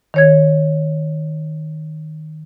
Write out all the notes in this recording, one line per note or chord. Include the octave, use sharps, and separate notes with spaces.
D#3 C#5 G#6